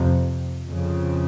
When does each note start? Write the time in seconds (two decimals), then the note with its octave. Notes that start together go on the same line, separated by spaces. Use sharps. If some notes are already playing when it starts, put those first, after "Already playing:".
Already playing: F2 C3
0.68 F2 C#3